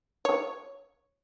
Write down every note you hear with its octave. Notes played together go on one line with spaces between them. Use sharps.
C#5